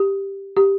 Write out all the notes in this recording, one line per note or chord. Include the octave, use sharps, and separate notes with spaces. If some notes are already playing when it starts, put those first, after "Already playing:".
Already playing: G4
G4